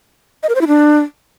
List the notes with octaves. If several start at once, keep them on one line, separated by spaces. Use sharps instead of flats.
D#5
A#4
C5
E4
D4